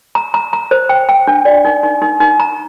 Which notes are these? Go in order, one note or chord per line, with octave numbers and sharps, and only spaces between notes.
A#5
A#5
A#5
C5
G5
G5
D4
D5
D#4
D#4
D#4
D#4
A#5